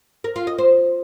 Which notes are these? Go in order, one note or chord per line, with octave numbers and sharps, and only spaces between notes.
A#4
F4
D#5
C5